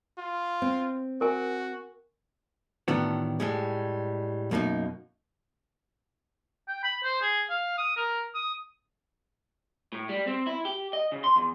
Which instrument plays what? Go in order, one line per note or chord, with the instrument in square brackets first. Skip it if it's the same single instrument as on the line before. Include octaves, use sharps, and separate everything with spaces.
[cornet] F4
[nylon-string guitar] C4
[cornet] F#4 [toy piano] A#4 G#5
[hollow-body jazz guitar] A2 D#3 E3 B3 D4 F#4
A2 G3 G#3
F#2 B2 A#3 C#4 D#4
[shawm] G5
B5
C5
G#4
F5
D#6
A#4
D#6
[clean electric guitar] A2
G3
C4
E4
G4
D#5
C#3
C6
E2